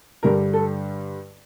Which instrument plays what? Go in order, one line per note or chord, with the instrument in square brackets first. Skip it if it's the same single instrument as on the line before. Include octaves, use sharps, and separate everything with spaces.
[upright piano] G2 D3 G3 A#4
A4